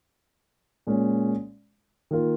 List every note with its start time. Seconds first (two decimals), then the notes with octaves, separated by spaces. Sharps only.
0.87 A#2 G#3 C#4
2.11 D#3 A#3 F4